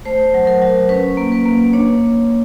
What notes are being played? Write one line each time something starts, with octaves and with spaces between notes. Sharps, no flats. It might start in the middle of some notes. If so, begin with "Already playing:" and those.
A3 C5
F#3
A#4
F#3
C#4 B4
A#3
B4
A#3
D4 C#5